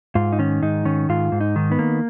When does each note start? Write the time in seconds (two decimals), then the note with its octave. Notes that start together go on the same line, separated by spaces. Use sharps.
0.15 G#2 F4
0.33 D#4
0.39 D#3 C#4
0.62 G#2 D#4
0.85 D#3 C#4
1.09 G#2 F4
1.32 G#2
1.41 D#4
1.56 D#3
1.72 B3
1.79 A#3